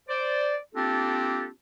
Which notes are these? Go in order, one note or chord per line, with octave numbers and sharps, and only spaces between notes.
C5 D5
A#3 C4 D4 F4 G4 A4